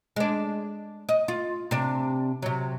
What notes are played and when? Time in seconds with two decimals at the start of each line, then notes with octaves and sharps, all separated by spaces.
0.16 G#3 D4
1.09 D#5
1.28 F4
1.71 C3 D4
2.42 C3 F#3